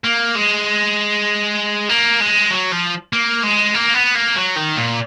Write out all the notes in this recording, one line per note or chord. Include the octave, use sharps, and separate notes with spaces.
A#3
G#3
A#3
G#3
F#3
F3
A#3
G#3
A#3
B3
A#3
F#3
D#3
A#2